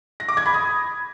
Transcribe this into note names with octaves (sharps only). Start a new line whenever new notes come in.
A#6
D6
G#6
B5
D#6